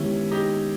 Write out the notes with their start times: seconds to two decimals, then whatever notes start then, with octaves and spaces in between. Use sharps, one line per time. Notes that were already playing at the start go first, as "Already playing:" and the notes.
Already playing: D#3 G#3 B3 C#4 E4 G4
0.31 D#4 G4